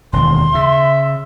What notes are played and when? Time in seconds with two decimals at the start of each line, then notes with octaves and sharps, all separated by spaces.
0.13 E1 D#2 C6
0.55 C#3 E5